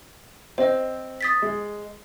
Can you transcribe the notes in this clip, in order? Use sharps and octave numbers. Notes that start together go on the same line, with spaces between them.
C4 C5 D#5
D#6 A6 B6
G#3